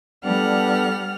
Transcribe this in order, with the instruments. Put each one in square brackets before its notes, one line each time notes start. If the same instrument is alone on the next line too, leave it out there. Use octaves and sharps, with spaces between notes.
[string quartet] G3 F#5 F6 [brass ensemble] B3 D4 A4